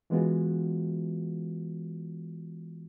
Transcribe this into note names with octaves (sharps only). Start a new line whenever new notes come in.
E3 G#3 B3 F4 F#4